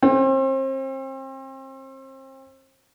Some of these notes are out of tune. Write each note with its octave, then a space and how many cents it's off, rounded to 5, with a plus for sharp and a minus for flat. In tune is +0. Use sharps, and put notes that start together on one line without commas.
C4 +35